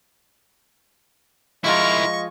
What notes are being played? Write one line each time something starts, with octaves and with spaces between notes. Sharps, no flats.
F3 G#3 E4 F4 A#4 D#5 C#6